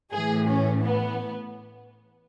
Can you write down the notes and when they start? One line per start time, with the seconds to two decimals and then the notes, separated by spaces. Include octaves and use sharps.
0.12 A2 E3 G#4
0.46 C#4
0.82 B3